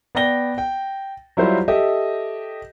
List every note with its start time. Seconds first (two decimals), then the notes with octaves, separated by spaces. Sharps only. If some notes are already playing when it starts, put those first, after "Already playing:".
0.15 B3 D5 G5 A#6 G7
0.58 G5
1.37 F#3 G3 E4 F4 C5
1.68 G4 A4 D#5 E5